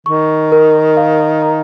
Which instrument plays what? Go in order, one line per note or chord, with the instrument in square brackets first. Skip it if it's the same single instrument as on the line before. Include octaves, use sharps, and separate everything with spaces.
[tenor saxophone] D#3 [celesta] C#6
[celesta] A#4
F5
A#5